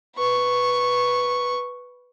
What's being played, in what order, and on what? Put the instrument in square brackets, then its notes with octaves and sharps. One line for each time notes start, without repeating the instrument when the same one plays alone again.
[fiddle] B4 C#6